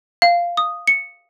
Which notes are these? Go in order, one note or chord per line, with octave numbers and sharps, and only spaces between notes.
F5
D#6
C#7